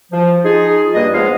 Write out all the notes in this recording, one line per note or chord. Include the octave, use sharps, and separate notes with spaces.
F3
D#4 F4 G#4
G2 G3 A#3 D#5
F3 G#3 B3 G#4 C#5 F5